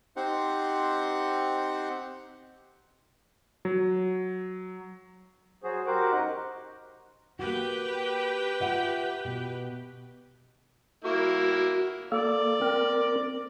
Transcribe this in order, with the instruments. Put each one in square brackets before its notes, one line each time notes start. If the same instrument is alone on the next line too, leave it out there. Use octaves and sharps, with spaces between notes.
[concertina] C4 D#4 G4 C5 F#5
[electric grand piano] F#3
[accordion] F#3 F#4 G#4 C5
F#4 G4 A#4 C5 F#5 D6
F#2 D#4 D#5 F#5 F#6
[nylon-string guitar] A#3 F#4 [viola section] G4 B4 G5
[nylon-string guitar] F4 E5 F#5
B2
[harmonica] A#3 E4 [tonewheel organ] F#4
[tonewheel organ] A#3 A4 [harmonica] D5
[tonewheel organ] C4 A#4